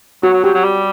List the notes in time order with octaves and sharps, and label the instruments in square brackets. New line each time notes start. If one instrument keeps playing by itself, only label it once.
[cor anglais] F#3 [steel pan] F#4
[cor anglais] F#3
[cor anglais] F#3 [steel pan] G4
[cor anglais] F#3
G3